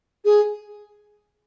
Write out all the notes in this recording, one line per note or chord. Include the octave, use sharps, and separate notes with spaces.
G#4